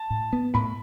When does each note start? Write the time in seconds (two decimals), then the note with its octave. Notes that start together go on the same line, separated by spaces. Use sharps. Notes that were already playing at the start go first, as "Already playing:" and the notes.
Already playing: A5
0.10 A2
0.33 B3
0.54 A2 B5